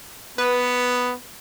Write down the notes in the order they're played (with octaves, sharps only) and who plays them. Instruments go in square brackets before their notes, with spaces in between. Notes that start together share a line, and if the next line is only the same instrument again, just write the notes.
[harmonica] B3 [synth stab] B4